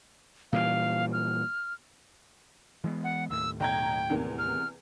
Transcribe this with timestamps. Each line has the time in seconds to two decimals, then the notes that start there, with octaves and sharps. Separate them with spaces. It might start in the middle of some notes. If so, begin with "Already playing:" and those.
0.53 A#2 E3 G3 F5
1.13 F6
2.84 E3 G#3 B3
3.04 F#5
3.30 D#2 A2 E6
3.60 B1 G5 A#5 G#6
4.10 E2 C3 A#3
4.38 F6